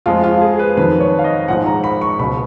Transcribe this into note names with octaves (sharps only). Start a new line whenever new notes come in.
F2 F3 G#3 F4
F4
G#4
B4
F2 D#3 F#3 B4
C#5
F5
D#5
A#1 G#2 F3 G#3 F#5
A#5
B5
C#6
C#2 B2 F#3 B5